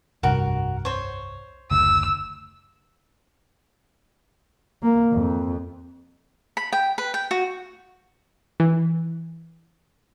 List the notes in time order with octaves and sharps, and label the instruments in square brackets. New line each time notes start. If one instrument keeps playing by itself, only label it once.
[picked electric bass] F1 C2 G2 [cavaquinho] F#4 A#4
[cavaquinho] C5 C#5
[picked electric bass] F#1 D2 [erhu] E6
[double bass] A#3
F2
[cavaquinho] B5
G5
B4
G5
F#4
[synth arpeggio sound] E3